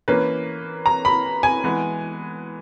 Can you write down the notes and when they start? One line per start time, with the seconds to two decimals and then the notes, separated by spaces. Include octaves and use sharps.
0.08 E3 A#3 C#4 B4
0.86 A#5
1.05 B5
1.43 G#5
1.64 E3 G#3 B3